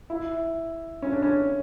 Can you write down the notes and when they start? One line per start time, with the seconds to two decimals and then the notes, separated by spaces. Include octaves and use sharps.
0.10 E4
1.02 C#4
1.12 D4
1.22 C#4